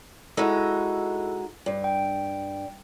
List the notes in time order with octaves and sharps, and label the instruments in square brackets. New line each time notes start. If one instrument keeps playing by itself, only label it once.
[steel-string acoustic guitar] G#3 D#4 F#4 [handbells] E4 A4
[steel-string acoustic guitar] G2
[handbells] G5